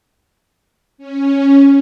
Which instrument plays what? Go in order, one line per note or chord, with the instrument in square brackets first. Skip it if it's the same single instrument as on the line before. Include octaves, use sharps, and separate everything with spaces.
[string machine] C#4